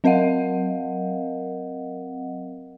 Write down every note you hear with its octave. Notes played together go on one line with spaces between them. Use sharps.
F#3 C4 A#4 D#5 F5 F#5